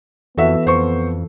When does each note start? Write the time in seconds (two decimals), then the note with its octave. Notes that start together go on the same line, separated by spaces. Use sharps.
0.38 F2 E3 B3 F#4 A4 E5
0.67 F2 C5 C#6